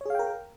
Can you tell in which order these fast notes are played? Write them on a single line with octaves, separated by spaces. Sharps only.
C#5 G#4 F5 G5 A#4